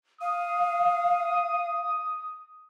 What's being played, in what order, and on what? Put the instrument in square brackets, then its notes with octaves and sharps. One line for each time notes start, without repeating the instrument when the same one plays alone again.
[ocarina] F5 [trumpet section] D#6